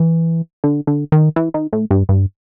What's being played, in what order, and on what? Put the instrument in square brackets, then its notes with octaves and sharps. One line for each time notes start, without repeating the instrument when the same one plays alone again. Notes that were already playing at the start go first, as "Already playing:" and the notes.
Already playing: [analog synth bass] E3
D3
D3
D#3
E3
D#3
A2
G2
G2